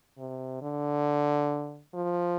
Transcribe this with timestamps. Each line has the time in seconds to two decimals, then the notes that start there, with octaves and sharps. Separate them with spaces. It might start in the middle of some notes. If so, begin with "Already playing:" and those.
0.18 C3
0.62 D3
1.95 F3